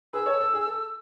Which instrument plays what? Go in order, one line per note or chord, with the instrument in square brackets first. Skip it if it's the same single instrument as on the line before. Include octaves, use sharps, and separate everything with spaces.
[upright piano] G#4 B4 [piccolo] E6
[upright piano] A4 C#5
A4
G#4
A4